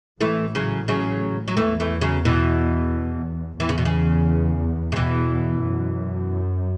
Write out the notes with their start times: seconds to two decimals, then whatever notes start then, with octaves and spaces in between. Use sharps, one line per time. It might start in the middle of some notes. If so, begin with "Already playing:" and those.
0.21 A1 A2 E3 A3
0.55 C#3 F#3
0.88 C#3 F#3
1.48 F#3
1.57 E2 E3 A3
1.80 E3 A3
2.01 C#3 F#3
2.25 B2 E3
3.60 E2 E3
3.69 C#3
3.78 B2
3.85 C#3
4.92 C#3
4.96 E2 B2 E3
5.65 F#2